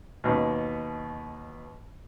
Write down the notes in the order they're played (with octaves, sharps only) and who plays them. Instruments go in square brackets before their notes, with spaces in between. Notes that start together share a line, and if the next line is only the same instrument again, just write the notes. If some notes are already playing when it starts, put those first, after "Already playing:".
[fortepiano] D#2 B2